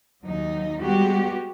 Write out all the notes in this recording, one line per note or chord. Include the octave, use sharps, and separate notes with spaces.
D#2 F#3 D#4
G3 G#3 B3 F#4 G4